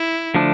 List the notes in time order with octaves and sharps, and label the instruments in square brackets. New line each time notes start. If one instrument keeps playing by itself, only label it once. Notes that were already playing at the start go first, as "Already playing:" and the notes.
Already playing: [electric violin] E4
[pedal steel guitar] D3 F3 A3 D4